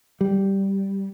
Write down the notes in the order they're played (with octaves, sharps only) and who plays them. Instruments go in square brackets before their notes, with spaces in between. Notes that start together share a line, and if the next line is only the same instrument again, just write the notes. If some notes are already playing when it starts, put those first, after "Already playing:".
[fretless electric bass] G3